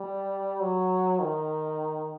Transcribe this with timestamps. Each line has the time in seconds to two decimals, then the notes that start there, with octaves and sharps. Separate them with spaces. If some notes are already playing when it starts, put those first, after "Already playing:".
Already playing: G3
0.60 F#3
1.20 D#3